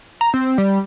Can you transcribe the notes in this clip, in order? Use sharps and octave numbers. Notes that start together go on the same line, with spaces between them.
A#5
C4
G3